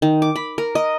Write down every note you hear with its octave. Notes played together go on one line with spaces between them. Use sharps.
D#3
D6
B5
A#4
D#5